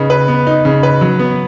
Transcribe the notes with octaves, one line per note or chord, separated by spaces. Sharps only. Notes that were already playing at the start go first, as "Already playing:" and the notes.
Already playing: C#3 B3 D#4
B4
B3
D#4
C#3
B4
F#3
B3